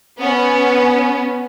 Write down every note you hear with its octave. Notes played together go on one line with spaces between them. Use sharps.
B3 C#4